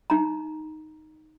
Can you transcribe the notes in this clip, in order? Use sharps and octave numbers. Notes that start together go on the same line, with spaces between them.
D#4 A#5